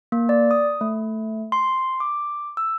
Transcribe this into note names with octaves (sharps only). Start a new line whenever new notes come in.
A#3
D5
D#6
A3
C6
D6
E6